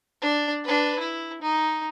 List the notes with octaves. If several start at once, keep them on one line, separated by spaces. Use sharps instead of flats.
D4 D5
D4 B4
E4
D#4